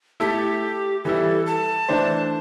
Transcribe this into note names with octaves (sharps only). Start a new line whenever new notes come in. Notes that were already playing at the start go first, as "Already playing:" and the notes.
A3 E4 G4 A4 E5
E3 G3 E4 A4
A5
E3 A3 D4 C5